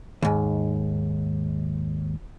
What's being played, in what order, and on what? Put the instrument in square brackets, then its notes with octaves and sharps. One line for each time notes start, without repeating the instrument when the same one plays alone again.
[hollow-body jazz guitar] D#2 G#2